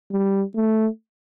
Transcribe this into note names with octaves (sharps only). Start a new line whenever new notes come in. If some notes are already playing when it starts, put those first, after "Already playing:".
G3
A3